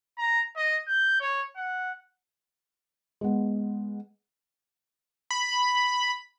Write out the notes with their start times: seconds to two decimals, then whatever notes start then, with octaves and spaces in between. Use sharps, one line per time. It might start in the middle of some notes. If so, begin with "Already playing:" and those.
0.18 A#5
0.57 D#5
0.87 G6
1.20 C#5
1.56 F#5
3.21 G#3 B3
5.31 B5